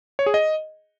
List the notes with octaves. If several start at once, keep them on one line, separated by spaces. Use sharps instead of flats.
C#5
G#4
D#5